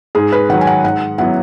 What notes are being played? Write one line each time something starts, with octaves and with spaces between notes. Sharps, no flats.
G#2 G#4
B4
D#3 F#3 F#5
G#5
F#5
G#2 F#5
F#3 B3 E4 F#5